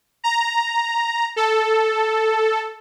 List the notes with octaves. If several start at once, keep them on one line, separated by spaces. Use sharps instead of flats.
A#5
A4